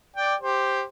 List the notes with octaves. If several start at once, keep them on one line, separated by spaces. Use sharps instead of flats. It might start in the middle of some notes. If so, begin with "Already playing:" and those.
D5 G5
G4 C5